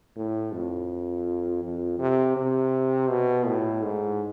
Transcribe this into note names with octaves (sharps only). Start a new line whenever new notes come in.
A2
F2
F2
C3
C3
B2
A2
G#2